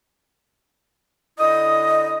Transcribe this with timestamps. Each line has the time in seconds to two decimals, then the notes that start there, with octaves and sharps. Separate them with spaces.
1.39 D3 E4 D#5 D#6